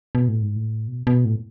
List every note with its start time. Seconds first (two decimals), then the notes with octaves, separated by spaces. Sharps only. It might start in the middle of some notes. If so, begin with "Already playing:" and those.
0.15 B2
0.28 A2
0.42 G#2
0.56 A2
0.88 B2
1.07 B2
1.25 A2